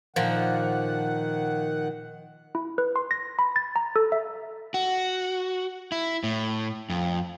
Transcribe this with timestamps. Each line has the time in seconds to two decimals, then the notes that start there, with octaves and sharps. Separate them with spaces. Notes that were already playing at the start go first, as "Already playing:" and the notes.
0.16 A#2 D#3 F3 F#5
2.55 E4
2.78 B4
2.96 C6
3.11 A#6
3.39 B5
3.56 A6
3.76 A#5
3.96 A4
4.12 E5
4.74 F#4
5.92 E4
6.24 A2
6.90 F2